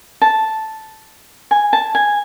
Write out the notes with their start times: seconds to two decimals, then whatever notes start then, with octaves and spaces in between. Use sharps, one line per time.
0.22 A5
1.51 G#5
1.73 A5
1.95 G#5